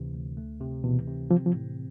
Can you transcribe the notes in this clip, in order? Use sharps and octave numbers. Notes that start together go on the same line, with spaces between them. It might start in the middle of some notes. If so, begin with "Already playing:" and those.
Already playing: D2 C3 E3
D2
A3
C3
B2 E3
C3
F3 C4
F3
A2